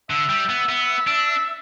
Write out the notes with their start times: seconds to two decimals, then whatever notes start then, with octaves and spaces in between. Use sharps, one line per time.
0.10 D3 E5
0.29 G3
0.49 B3
0.69 B3
1.07 D4